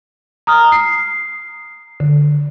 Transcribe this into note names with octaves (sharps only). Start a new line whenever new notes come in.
A#5 D#6 F6
C7
D3